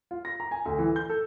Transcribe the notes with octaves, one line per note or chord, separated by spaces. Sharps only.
F4
A#6
A#5
G#5
D2
E3
G6
A4